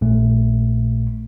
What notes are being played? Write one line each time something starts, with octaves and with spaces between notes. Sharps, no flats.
A#1 A#2 A3